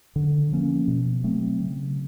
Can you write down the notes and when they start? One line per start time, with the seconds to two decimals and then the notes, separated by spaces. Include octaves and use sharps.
0.16 D3
0.52 F3 A#3 C#4
0.88 B2
1.24 F#3 A3 C4
1.60 C#3